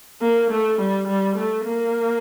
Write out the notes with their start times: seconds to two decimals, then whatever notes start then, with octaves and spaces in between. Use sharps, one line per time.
0.21 A#3
0.50 A3
0.79 G3
1.07 G3
1.36 A3
1.65 A#3